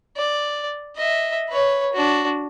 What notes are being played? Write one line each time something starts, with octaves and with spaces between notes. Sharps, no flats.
D5
D#5 E5
B4 C#5
D4 F#4